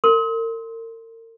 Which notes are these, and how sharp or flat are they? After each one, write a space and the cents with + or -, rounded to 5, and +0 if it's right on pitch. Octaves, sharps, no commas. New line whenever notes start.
A#4 -45 C6 +0